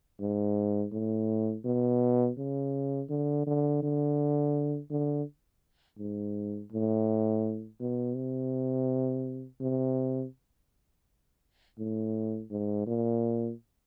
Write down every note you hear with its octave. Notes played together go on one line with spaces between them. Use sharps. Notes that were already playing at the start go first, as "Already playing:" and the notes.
G#2
A2
B2
C#3
D3
D3
D3
D3
G#2
A2
B2
C3
C3
A2
G#2
A#2